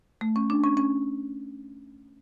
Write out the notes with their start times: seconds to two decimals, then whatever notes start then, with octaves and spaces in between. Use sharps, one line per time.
0.21 A3
0.36 C#4
0.50 D4
0.64 C#4
0.77 C#4